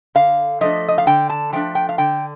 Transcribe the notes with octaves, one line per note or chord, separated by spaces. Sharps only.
D3 F5
F3 A3 D4 D#5
D#5
F5
D3 G5
A5
F3 A3 D4 G5
G5
F5
D3 G5